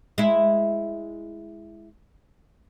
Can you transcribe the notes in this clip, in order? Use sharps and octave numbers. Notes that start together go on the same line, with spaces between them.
G#3 E4